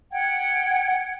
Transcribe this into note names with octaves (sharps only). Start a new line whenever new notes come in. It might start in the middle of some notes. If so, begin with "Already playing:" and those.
F#5 G5 G#6